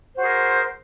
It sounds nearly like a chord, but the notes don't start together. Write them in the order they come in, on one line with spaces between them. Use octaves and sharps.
C5 F#4 G#4 A#4